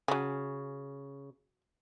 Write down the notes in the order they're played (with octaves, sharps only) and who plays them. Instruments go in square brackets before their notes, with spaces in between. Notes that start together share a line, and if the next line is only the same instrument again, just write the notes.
[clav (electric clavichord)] C#3 [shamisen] F#3 G#5